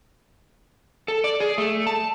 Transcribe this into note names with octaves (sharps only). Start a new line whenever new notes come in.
A4
D5
G#4
A3
A5